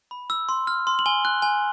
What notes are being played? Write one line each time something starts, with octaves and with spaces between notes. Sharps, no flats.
B5
E6
C6
F6
C6
F#7
G#5 G7
F#6
G#5